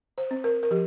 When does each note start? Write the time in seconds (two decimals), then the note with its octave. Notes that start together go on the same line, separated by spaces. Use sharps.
0.18 C5
0.31 C4
0.44 A#4
0.63 A#4
0.71 F3 G4